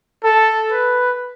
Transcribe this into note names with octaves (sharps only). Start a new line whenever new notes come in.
A4
B4